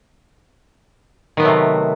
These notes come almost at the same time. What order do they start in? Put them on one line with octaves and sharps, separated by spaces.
D#3 B3 F#3 A3 C3